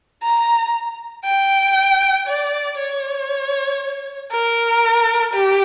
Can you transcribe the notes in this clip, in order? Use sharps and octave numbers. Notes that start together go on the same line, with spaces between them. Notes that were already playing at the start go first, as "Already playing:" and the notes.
A#5
G5
D5
C#5
A#4
G4